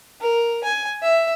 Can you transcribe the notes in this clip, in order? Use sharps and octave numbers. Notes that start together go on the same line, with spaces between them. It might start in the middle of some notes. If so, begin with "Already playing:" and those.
A#4
G#5
E5